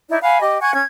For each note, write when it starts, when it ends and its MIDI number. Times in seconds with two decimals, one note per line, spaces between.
0.09 0.21 63
0.09 0.21 64
0.09 0.21 74
0.21 0.40 77
0.21 0.40 78
0.21 0.40 80
0.21 0.40 83
0.41 0.61 67
0.41 0.61 75
0.61 0.70 78
0.61 0.70 80
0.61 0.70 85
0.61 0.70 92
0.74 0.84 61
0.74 0.84 92